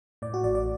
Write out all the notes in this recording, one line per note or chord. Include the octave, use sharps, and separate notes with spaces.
A2 D5
F#4
A1 D5
D5